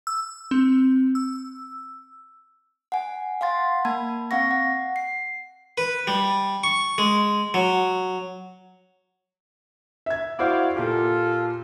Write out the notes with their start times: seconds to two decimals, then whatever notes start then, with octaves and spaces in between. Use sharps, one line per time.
0.07 E6
0.51 C4
1.15 E6
2.92 F#5 G#5
3.41 F5 F#5 C6 A6
3.85 A#3 A5 B5 G#6
4.31 C4 F5 F#5 C#6 A#6
4.51 F#5
4.96 C7
5.78 B4
6.07 G3
6.64 C#6
6.98 G#3
7.54 F#3
10.06 E5 G#6
10.39 E4 F#4 C5 D5 F5
10.76 A#2 F4 G4 A4